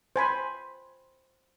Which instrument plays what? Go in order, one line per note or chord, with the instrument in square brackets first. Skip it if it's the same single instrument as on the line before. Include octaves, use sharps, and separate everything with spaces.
[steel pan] C5 G#5 B5